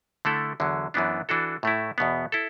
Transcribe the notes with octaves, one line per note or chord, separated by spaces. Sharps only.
D3 A3 E4 A4
E2 D3 F#3
F#2 E3 B3 D4
E3 D4 F#4 A4
A2 A3 E4
E2 B2 B3
E4 A4